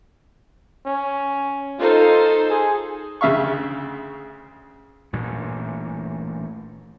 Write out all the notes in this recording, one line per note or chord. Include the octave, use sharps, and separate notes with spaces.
C#4
D#4 F4 A4 C5
G#4
D2 C#3 E5 F5 C#6
A1 G2 A#2 E3